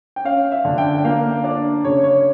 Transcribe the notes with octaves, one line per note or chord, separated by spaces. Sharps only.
G5
C#4 F5
E5
D3
G5
G5
A#3 F5
D4 D5
C#3 C#5
C#5